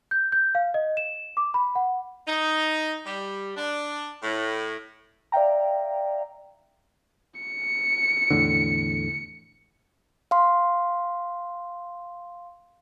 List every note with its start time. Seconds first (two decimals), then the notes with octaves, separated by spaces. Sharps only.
0.11 G6
0.32 G6
0.55 F5
0.74 D#5
0.97 E7
1.37 D6
1.54 B5
1.75 F#5
2.26 D#4
3.05 G3
3.56 D4
4.23 A2
5.32 D5 E5 F5 G5 A#5
7.41 C#7
8.30 E2 A2 D3
10.31 F5 C6